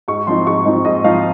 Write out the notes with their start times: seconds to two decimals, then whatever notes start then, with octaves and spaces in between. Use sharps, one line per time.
0.08 G#2 C#6
0.27 F3 C4 D#4 C6
0.46 G#2 C#6
0.66 F3 C4 D#4
0.85 G#2 D#5
1.04 F3 C4 D#4 F5